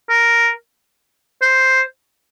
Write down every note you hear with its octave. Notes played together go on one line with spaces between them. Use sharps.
A#4
C5